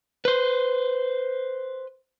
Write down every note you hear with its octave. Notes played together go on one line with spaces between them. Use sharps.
B4 C5